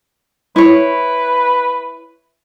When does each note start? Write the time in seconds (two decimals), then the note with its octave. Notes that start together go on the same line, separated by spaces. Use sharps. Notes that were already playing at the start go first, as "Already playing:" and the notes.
0.56 E4 B4 C#5